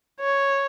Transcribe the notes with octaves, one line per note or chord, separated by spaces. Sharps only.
C#5